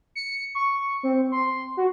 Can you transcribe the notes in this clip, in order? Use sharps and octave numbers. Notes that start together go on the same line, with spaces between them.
C#7
C#6
C4
C6
F#4